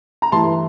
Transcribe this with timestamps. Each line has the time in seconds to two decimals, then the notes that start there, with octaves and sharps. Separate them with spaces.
0.22 A#5
0.32 G2 E3 A3 E4 A5 C6